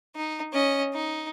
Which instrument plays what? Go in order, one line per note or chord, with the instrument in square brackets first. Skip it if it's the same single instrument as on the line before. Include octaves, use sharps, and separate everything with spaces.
[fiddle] D#4
C#4 D#5
D#4